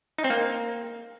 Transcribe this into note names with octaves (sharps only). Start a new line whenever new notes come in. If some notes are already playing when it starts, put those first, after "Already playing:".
D#4
C4
A#3